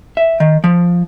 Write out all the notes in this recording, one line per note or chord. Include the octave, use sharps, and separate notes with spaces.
E5
D#3
F3